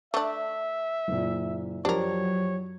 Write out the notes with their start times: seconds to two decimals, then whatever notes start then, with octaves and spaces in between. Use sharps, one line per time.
0.14 A3 D4 E5
1.08 F#1 A#2
1.85 F#2 F3 F#3 D4 G4 A#4 C#5